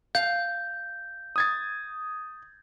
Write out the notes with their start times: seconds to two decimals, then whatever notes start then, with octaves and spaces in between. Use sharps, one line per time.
0.15 F5 G6
1.36 D#6 G#6 A6